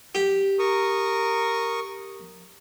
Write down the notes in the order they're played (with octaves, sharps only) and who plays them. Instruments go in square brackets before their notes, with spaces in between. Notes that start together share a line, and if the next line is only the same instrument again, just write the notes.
[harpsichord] G4
[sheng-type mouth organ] A#4 C#6 D#6